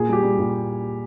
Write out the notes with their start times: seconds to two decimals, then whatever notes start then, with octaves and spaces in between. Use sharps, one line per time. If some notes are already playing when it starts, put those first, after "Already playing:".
Already playing: A#2 G#4
0.08 G3 G4
0.23 G3
0.39 A#2